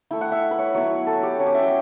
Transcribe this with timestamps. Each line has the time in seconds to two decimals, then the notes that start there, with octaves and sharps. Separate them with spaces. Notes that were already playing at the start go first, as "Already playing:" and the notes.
0.11 A3 E4 G5
0.21 F#5
0.32 E5
0.51 B4
0.59 C#5
0.74 F#3 B3 E4 C#5
1.07 A4
1.23 G4
1.39 F#3 C#4 E4
1.46 G4
1.55 E5
1.62 G5